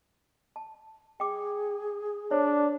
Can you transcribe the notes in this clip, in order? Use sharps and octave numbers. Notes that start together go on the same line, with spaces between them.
A5
G#4 G5 D6
D4 C5 C#5